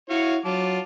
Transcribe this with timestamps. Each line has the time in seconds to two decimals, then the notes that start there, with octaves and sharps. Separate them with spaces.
0.10 E4 F#4 C#5 F5
0.45 F#3 F4 A5 D6